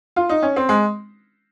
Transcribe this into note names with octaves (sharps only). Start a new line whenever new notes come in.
F4
D#4
C#4
C4
G#3